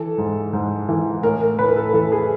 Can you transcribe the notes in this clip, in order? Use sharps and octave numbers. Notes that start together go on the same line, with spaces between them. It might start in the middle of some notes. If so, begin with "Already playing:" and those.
Already playing: E3 A4
G#2
G#2
E3
A2 A#4
A#4
A2 B4
A#4
A4
E3 A4
G#4